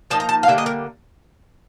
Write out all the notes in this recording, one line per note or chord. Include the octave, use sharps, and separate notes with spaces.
F3 A#3 D#4 A5
A#5
A5
F5
D3 G3 A#3 E5
D#5
A#4